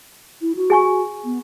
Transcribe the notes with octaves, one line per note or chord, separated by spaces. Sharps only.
E4
F#4
G#4 G#5 C#6
B3